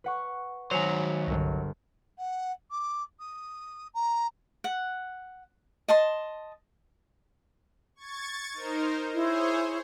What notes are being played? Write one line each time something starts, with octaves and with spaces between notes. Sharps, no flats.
B4 F#5 C#6
D#3 F#3 C5 C#5 G#5
G1 C2 A#4 A#6
F#5
D6
D#6
A#5
F#5
D#5 A5 C6
C#6 G#6 A6
D#4 A#4 C5
E4 G#4 C5 C#5